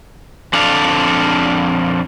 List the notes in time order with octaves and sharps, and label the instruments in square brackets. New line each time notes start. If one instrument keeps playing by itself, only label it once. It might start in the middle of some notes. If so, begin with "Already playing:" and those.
[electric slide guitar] F2 D4 A4 F5